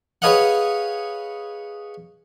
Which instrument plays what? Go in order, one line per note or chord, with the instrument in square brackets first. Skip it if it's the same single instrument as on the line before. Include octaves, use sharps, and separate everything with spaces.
[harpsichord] G#4 B4 C#5 D#5 F5 F#5